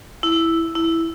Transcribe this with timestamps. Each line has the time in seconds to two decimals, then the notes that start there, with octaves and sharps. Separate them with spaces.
0.23 E4
0.75 E4